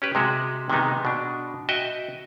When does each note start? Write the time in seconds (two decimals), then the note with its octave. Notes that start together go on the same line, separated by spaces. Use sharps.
0.02 C#4 G4 B4
0.15 C3 G#3 F#4
0.70 C3 D#3 G#3 B3 D#4
1.05 B2 D4
1.69 F#4 D#5 E5 G5